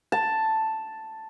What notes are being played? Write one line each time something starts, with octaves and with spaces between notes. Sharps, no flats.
A5